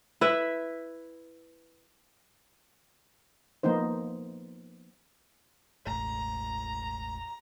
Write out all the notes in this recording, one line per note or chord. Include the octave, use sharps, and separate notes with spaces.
E4 B4 E5
F3 A#3 B3 D#4 C5
E1 A1 A2 A#5